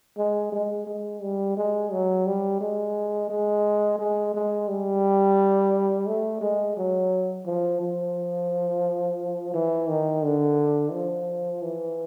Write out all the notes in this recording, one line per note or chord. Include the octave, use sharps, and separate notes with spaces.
G#3
G#3
G#3
G3
G#3
F#3
G3
G#3
G#3
G#3
G#3
G3
A3
G#3
F#3
F3
F3
E3
D#3
D3
F3
E3